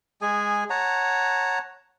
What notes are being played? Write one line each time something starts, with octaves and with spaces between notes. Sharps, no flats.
G#3 G#4 G#5
C#5 F#5 A5 A#5